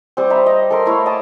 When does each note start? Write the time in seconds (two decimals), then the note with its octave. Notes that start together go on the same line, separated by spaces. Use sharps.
0.17 G3 C4
0.30 D#5 E5 A#5 B5
0.46 D#5
0.71 A4 A#4 C6
0.86 A3 E4 C#5 F5
1.06 D#5 A5 D6